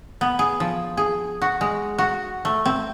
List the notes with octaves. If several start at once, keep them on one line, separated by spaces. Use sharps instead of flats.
B3
G#4
F3
G#4
F#4
G#3
F#4
A3
C4